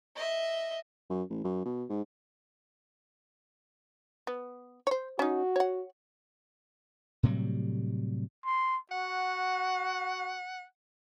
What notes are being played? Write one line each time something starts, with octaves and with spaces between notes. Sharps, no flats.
D#5 E5
F#2
A1
F#2
B2
G#2
B3
C5 C#5
C#4 D#4 F#4
C#5 F#5
A2 C3 F#3 G3
C6
F#4 F#5